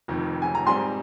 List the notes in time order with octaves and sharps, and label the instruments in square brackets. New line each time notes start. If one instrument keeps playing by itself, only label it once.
[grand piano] F1 F2 D#3
[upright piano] G#5
A#5
[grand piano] G#2 G3 C4 [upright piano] G#5 C6